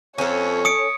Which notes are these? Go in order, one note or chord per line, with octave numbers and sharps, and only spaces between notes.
F2 C#4 A4 C#5
D#6 C#7 D7